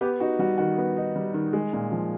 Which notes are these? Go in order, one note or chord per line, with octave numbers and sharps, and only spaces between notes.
B3 G4
D#4 F#4
G3 F#4
D#3 F#4
B3
D#4
G3
D#3
G#3
A#2
F3